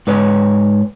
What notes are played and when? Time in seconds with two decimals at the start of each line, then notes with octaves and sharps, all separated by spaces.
0.07 G#2 B4 C#5